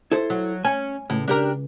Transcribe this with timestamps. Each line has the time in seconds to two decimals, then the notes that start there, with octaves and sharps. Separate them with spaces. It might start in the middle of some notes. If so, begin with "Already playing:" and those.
0.11 E4 A4 C5
0.30 F#3
0.65 C#4 G#5
1.10 C#2 A2
1.28 D4 G4 A#4